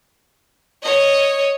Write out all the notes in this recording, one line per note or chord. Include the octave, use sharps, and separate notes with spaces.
C#5 D#5